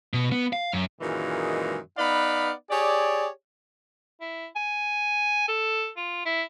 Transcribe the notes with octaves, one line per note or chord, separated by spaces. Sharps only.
B2
B3
F5
F#2
F#2 A#2 D#3 E3 G#3
B3 D#4 B4 D5 F5 B5
G4 G#4 C#5 D5
E4
G#5
A4
F4
E4